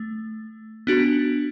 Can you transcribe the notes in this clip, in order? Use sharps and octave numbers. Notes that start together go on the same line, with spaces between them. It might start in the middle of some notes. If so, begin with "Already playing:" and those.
Already playing: A3
B3 D4 F#4